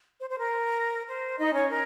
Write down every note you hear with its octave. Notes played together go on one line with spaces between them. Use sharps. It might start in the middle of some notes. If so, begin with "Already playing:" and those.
C5
C5
A#4
C5
D#4 D#5
C#4 C#5
A#4